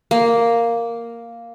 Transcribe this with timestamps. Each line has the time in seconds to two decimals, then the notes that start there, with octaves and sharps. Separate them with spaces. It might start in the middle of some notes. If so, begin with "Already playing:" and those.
0.11 A#3